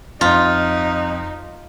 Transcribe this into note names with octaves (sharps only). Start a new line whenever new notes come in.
F2 D#4 F4 C6